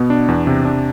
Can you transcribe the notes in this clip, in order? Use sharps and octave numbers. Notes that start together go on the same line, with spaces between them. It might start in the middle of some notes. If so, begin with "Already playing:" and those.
Already playing: B2 B3
D4
E2
C3
D4